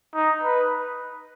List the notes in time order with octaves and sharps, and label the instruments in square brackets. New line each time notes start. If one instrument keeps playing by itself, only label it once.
[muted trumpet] D#4
B4